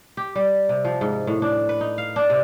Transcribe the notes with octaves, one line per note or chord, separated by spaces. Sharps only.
G4
G3
C3
F3
G#2
A2
D4
B4
D#4
F5
D4
C3